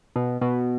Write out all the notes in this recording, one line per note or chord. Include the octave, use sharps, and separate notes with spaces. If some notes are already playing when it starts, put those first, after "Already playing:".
B2
B2